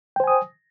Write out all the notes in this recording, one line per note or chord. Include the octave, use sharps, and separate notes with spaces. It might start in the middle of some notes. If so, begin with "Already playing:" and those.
C5 G5 G#5 D#6